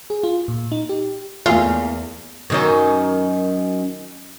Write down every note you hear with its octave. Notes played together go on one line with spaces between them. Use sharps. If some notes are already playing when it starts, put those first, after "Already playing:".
G#4
F4
A#2
D#4
G4
E2 A3 A#3 F4 G#4
F#2 D#3 C#4